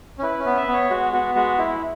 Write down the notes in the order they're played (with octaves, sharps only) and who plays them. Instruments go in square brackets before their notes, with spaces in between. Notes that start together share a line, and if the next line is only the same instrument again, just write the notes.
[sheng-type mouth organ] C#4
[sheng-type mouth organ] E4 [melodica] B4
[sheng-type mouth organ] C#4
[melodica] B3
[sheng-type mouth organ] E5
[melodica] B3
[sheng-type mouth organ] C#5
[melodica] G#3 [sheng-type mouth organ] F#4
[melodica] B3 [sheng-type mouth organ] F#4
[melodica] G#3 [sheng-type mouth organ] F#4
[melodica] G#3 [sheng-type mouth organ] E4